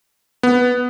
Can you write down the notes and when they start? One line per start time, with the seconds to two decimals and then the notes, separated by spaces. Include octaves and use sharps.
0.43 B3